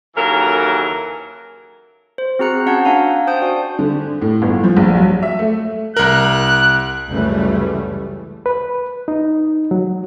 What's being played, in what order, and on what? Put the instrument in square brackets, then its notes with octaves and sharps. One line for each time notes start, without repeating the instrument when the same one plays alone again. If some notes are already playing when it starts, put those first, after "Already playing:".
[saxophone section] D#2 C#3 E3 F#3 A4 A#4
[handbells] C5
C4 F#4 G#4 A#5 F#6 C#7
C#4 F#4 F#5 A5 G6 G#6
D4 F5 F#5 G#5 A#5
C5 G5 A5 D#6 G6
F#4 D5 G#5
[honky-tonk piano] D3
A2
G1
F3
A#1
F#3
E5
A3
[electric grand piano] C2 A#4 [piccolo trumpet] F#6
[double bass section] C#2 F#2 C#3 E3 G3 A3
[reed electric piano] B4
D#4
F#3